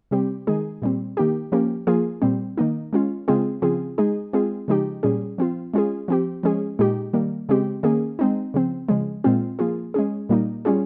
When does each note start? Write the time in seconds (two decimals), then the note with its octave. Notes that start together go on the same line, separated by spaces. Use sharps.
0.11 C3 G3 C4 G4
0.47 D#3 G#3 D#4 G#4
0.82 A#2 G3 C4
1.17 D#3 A#3 D#4 G4
1.52 F3 A#3 C#4 G4
1.87 F3 A#3 F4 G#4
2.22 A#2 G3 C4
2.57 D#3 A#3 D#4
2.93 G#3 C#4 F4
3.28 C#3 G#3 C4 F4 G#4
3.62 C#3 F3 C4 F4 G#4
3.98 G#3 D#4 G#4
4.33 G#3 C4 F4 G#4
4.68 C#3 F3 G#3 D#4 G4
5.03 A#2 G3 C#4 G#4
5.38 F3 C4 F4
5.74 G#3 C#4 F4 G#4
6.08 F3 C4 G4
6.43 F3 G#3 C#4 G#4
6.79 A#2 G#3 D#4 G4
7.13 D#3 G3 A#3
7.49 C#3 G#3 C4 G4
7.83 D#3 A#3 C#4 G#4
8.19 G#3 C4 D#4
8.54 C#3 F3 C4
8.89 C#3 F3 G#3
9.24 A#2 G#3 C4 F4
9.59 F3 A#3 F4 G#4
9.94 G#3 C#4 G#4
10.29 A#2 G3 A#3 D#4
10.65 G3 C#4 F4 G#4